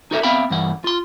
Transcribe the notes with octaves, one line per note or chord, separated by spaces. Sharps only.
D#4 F#4 A4 A#4 D#5 E5
B3 C4 E5 F5 G5 B5
G2 E3 F#5
F4 C6